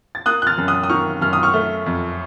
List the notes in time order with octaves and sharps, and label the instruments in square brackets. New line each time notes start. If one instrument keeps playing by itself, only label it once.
[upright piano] A6
A#3 D#6 F#6
F#6
F6 A6
F#2
D#6 F#6
D#6
D#3 C#6 F6
F#2 F6
D#6
C#6 F6
A3
F2